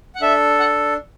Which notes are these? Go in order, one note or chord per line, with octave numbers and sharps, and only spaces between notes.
F#5
D4 A4 E5
F#5